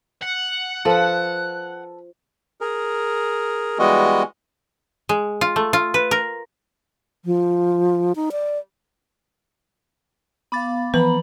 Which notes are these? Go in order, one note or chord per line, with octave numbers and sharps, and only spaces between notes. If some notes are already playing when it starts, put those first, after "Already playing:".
F#5
F3 A4 B4
G#4 A#4
E3 G3 G#3 B3 F#4 D#5
G#3
F4
A3
F4
B4
A#4
F3
D#4
D5
B3 F5 B5 D6 A6
E3 F3 B3 B4 A#5 B5 F#7